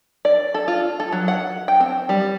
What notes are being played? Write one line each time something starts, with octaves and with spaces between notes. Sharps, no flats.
D5
A4
F4
A4
F#3
F#5
G5
C4
G3